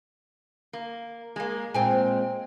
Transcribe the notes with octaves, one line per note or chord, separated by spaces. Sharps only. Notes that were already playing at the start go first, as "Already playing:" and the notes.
A#3
G#3 A#3
A#2 G#3 C4 G5 G#5